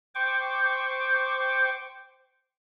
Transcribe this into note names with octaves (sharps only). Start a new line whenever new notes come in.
C5 G5 C#6 D6